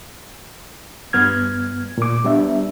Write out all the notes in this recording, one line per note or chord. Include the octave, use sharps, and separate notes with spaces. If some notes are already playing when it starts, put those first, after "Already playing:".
G2 B3 F6 G#6
A#2 D6
G3 B3 D4 E5